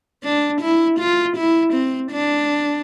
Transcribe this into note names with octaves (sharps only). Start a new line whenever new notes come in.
D4
E4
F4
E4
C4
D4